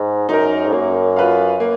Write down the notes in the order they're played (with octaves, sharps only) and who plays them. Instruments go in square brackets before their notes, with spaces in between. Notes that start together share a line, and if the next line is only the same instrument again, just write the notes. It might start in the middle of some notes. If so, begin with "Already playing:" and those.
Already playing: [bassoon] G#2
[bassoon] F#2 [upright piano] D#4 A#4
[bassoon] G#2
[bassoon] F#2 [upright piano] A#3
[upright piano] F4 B4 F5
A#3